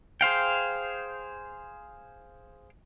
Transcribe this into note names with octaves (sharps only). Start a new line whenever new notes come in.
G#4 C5 F5 G5